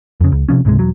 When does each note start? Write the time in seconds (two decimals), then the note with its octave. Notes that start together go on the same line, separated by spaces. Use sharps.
0.21 F2 C#3
0.32 C#2
0.49 C3 D#3 F3 C#4
0.65 C#2 G#2 C3 G#3
0.79 E1 F#3